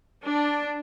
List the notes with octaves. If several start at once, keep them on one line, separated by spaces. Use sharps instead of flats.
D4